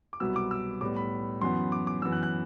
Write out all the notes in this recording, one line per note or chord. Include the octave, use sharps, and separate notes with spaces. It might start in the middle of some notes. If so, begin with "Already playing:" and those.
D6
C2 B2 F#3 B3 E6
D6
E6
A2 G3 B3 D6
B5
F#2 E3 B3 C6
D6
D6
F#2 E3 B3 E6
F#6
F#6